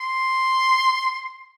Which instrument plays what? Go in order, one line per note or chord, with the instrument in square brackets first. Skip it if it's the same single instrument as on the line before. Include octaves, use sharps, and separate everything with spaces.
[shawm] C6